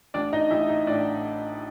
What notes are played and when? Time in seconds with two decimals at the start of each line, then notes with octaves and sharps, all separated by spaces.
0.14 A1 D4 D5
0.33 D#4 D#5
0.51 A1 E4 E5
0.69 D#4 D#5
0.87 A2 D4 D5